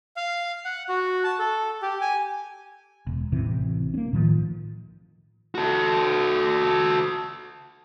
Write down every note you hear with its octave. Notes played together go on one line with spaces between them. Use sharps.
F5
F#5
F#4
A5
A4
G4
G#5
E1
A1 C3 E3
A#3 C#4
A2 D#3 F3
F#4 A4